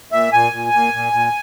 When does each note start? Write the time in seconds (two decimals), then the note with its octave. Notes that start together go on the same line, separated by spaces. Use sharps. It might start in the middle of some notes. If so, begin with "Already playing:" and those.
0.12 A#2 E5
0.33 A#2 G#5
0.53 A#2
0.73 A#2
0.93 A#2
1.13 A#2